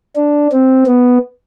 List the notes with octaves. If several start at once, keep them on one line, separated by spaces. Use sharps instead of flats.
D4
C4
B3